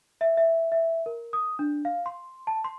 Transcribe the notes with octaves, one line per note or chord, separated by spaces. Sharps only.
E5
E5
E5
A#4
D#6
D4
F5
C6
A5
C6